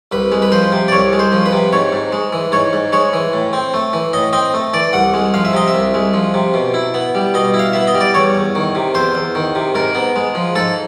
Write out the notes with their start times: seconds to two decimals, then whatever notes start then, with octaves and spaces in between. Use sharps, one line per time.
0.12 C2 B4
0.32 G#3
0.42 B4
0.52 F3 C5
0.72 C3
0.88 D5
0.92 C2 C#5
1.13 G#3
1.19 C5
1.32 F3
1.46 B4
1.53 C3
1.73 G#2 C#5
1.92 G#2
2.12 G#3
2.32 E3
2.52 G#2 C#5
2.73 G#2
2.93 G#3 C#5
3.13 E3
3.33 A2
3.53 C4
3.74 A3
3.93 E3
4.13 A2 D#5
4.33 C4 D#5
4.54 A3
4.73 E3 D5
4.93 C2 F#5
5.14 G#3
5.34 F3 F5
5.45 E5
5.53 C3 D#5
5.67 E5
5.74 C2
5.94 G#3
6.14 F3
6.34 C3
6.54 B2
6.74 E4
6.94 B3
7.15 G3
7.34 B2 D#5
7.54 E4
7.59 F5
7.73 B3 E5
7.87 D#5
7.95 G3
8.01 D5
8.14 E2 C#5
8.35 E2
8.55 D#3
8.75 C3
8.95 E2 C5
9.15 E2
9.35 D#3
9.55 C3
9.75 G#2 A#4
9.95 B3
10.16 G#3
10.35 F3
10.56 G#2 A4